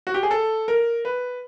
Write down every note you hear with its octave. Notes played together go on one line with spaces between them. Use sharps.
F#4
G4
G#4
A4
A#4
B4